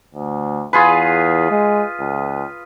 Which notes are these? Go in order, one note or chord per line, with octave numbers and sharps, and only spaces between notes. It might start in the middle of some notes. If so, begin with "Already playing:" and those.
D2
E2 F4 G#4 B4
G#3
C#2